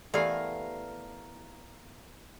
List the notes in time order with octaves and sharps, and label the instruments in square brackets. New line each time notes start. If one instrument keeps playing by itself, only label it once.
[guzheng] E3 A3 B3 [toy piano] G4 D5 C6 [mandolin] A#4 F5